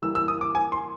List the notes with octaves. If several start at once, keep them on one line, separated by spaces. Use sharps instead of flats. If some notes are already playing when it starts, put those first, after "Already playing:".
E3 G3 A#3 E6
E6
D#6
D6
G#5
C6